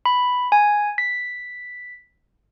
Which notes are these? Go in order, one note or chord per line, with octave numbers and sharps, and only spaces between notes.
B5
G#5
B6